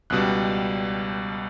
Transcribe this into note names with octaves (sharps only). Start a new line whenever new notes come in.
C#2 B2 G3 F#6